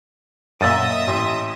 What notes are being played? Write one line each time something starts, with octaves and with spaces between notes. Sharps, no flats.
F#2 A#2 D#5 E5 D#6 E6 A6 D#7
A1 C6